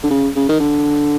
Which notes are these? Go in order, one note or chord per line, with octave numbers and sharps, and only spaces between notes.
D3
C#3
C#3
D#3
D3